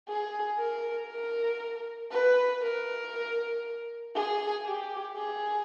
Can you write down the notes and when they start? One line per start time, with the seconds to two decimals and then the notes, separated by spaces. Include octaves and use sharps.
0.08 G#4
0.59 A#4
1.09 A#4
2.11 B4
2.62 A#4
4.15 G#4
4.65 G4
5.16 G#4